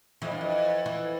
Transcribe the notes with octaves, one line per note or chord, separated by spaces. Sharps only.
F2 E3
G2
F2
E3